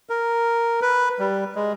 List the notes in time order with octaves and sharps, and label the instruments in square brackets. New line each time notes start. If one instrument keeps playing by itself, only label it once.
[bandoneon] A#4
B4
G3
G#3